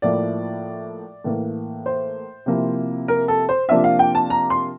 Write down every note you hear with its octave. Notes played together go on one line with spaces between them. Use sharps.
A2 F3 A#3 E4 D5
A2 E3 A#3
C5
C3 F3 A#3 E4
A#4
A4
C5
C3 F3 A#3 D4 F4 E5
F5
G5
A5
A#5
C6